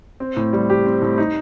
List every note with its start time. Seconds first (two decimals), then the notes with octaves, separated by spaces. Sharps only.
0.20 C4
0.36 A2
0.53 G3
0.70 G4
0.86 C4
1.02 A2
1.18 D#4